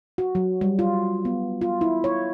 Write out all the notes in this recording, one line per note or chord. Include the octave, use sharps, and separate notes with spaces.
F#4
F#3
G3
F4
B3
F4
E4
C#5